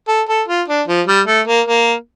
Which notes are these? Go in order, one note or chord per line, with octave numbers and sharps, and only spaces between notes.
A4
A4
F4
D4
F3
G3
A3
A#3
A#3